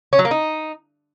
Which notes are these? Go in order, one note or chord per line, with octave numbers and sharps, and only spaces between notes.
C#4
F#3
A#3
D#4